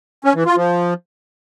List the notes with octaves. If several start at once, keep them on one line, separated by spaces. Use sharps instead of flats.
C#4
E3
F4
F3